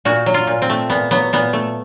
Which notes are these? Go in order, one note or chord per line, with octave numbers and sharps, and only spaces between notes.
A#2 F#4
F#3
F4
A#2
C4
A3
A#2 B3
F#3 B3
A#2 B3
A3